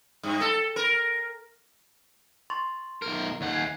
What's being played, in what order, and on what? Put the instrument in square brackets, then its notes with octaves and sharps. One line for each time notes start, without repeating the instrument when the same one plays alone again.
[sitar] G2
A4
A#4
[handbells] C6 C#6 A6
[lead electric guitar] B1 A#4
D#2 F#5
[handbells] G#5 G#6 C7